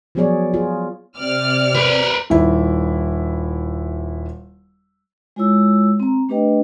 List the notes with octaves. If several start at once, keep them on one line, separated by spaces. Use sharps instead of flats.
F3 F#3 B3 G#4 C#5 D5
F4 G#4
C3 D5 F6
A#4 B4
D#1 E4
G#3 E4 F4 C#5 E6
C4 A#5
A3 D4 G4 B4 D#5 G5